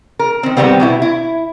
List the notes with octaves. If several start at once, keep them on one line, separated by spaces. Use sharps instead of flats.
A#4
D#3 C4
C3 D#3 F#3 G3 B3 C4
B2 B3 E4
E4